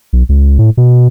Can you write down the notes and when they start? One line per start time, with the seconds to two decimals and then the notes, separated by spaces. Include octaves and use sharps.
0.13 B1
0.29 C#2
0.59 A2
0.77 B2